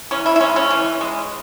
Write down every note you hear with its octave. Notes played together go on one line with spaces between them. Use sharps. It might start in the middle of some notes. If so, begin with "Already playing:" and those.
E3 C#4
E4
E4
G#3 C#4
C#4
E3
G#3